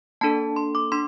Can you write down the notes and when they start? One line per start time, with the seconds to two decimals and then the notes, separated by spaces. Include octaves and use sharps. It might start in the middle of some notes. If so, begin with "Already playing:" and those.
0.21 A#3 D4 A4 A5
0.56 C6
0.75 D6
0.92 D4 C6